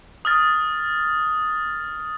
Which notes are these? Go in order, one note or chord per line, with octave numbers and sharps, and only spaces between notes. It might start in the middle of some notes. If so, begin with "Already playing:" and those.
D#6 F6 A6